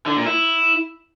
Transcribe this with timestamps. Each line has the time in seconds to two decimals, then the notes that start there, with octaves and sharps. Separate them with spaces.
0.06 D3
0.16 A#2
0.26 E4